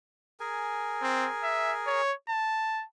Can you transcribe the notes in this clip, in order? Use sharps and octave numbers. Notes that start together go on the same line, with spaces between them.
G#4 A#4 G#5
C4
E5
C#5
A5